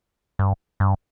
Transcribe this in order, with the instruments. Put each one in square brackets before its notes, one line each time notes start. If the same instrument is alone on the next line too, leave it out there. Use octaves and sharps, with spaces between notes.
[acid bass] G2
G2